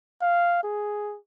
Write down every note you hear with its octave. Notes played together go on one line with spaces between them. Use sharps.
F5
G#4